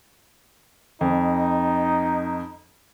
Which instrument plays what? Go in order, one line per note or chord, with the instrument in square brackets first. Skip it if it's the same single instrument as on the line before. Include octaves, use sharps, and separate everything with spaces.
[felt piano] F2 [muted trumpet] D#4